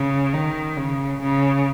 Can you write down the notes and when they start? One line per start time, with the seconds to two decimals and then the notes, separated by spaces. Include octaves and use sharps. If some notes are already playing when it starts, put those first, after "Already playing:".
Already playing: C#3
0.34 D#3
0.77 C#3
1.22 C#3